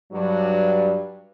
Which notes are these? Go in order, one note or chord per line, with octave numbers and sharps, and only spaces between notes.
G2 F#3